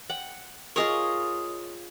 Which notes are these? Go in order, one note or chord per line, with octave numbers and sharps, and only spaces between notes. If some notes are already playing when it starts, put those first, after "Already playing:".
F#5 G5
F4 G#4 A#4 C#5 D#5